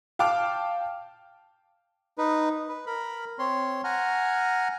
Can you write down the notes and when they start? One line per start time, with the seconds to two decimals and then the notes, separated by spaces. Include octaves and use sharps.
0.19 F5 G5 A5 D6 F6
2.18 D#4 B4
2.69 B4
2.86 A#4 B5
3.39 C4 C#5 C6
3.84 F#5 G#5 A#5 F6